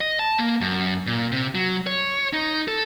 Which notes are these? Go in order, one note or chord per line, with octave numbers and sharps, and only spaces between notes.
D#5
A5
A#3
F#2
A#2
C3
F#3
C#5
D#4
A4